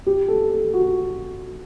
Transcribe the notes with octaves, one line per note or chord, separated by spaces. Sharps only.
G4
A4
A4
F#4